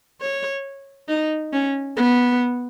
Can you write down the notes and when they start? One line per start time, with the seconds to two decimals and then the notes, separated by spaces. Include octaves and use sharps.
0.21 C#5
1.08 D#4
1.52 C#4
1.97 B3